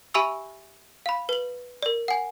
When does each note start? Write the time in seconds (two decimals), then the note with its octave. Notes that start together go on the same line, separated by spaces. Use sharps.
0.14 G4 E5 G#5 B5 C#6 E6
1.06 F5 B5
1.29 B4 F#7
1.83 A#4 D5
2.08 F#5 G#5